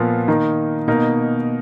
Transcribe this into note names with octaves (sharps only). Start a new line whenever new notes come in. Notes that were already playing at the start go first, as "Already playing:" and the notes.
Already playing: A#2 F3 B3
D#3 A#3 D#4
B2 A#3 D#4 A#4